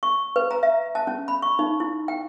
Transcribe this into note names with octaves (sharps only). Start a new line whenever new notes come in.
C#6
B4
A#5
E5
A5
C#4
B5
C#6
D#4
E4
G5